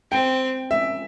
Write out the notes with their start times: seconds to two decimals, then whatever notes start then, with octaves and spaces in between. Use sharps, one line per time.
0.11 C4 G5
0.71 E5